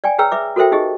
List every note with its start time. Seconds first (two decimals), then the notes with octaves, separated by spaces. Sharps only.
0.04 D5 G5 G#5
0.18 G#4 B4 C#5 G5 A#5 E6
0.31 B4 E5 D6
0.56 F#4 A4 A#4 C5 E5 G5
0.72 D#4 G4 G#4 D#5